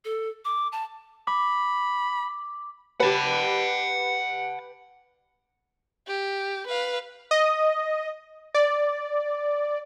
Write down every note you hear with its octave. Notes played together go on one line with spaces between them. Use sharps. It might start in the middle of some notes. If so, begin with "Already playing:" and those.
A4
D6
A5
B5 D6
G4 B4 F#5 A5
G4
B4 F5
D#5
D5